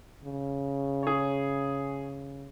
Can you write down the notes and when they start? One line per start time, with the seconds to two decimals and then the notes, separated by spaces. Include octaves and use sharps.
0.24 C#3
1.03 G#4 C#5